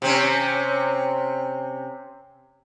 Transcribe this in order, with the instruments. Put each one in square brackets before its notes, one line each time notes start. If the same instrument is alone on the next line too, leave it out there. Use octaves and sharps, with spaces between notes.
[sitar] C3 C4 C#4